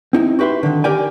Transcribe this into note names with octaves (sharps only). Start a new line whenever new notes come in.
C4 D#4 E4
F#4 G4 B4 E5 C6
D3 D#3
G4 A#4 D5 G5 G#5